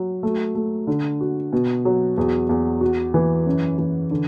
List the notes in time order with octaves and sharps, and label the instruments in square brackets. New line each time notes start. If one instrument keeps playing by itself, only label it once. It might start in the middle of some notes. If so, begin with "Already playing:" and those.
Already playing: [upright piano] F#3
A3
A3
D3
F#4
B2
F#3
E2
E2
F#4
E3
F#2
E3
D3